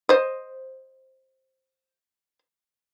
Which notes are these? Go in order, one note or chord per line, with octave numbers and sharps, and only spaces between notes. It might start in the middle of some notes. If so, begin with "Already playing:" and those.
C5 D#5